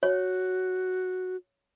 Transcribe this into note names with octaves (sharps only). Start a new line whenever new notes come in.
F#4 C#5